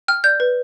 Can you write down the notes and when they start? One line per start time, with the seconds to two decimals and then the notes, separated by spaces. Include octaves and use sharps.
0.08 G5 F6
0.24 D5 G6
0.40 B4